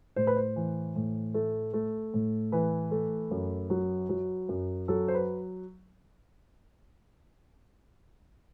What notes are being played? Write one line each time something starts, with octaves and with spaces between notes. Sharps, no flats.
A2 C5
B4
C5
E3
A2
A3
A3
A2
E3 B4
A3
F#2
F#3
F#3
F#2
F#3 A4
C5
B4